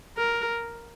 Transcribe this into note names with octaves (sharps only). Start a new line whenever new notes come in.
A#4